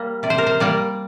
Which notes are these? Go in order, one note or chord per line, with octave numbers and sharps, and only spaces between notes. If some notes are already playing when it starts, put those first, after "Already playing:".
Already playing: G3 A#3
C3 D5
C5
A#4
C5
G3 A#3 D5